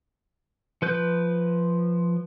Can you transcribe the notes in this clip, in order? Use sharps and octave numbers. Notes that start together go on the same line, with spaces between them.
F3 B4 G6